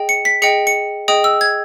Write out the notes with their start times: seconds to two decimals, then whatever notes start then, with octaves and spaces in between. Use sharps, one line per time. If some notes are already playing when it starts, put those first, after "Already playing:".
Already playing: G#4 D#5 G5
0.09 C#7
0.25 B6
0.42 G#4 D#5 G5 C#7
0.67 C#7
1.08 G#4 D#5 G5 D#6
1.24 E6
1.41 G#6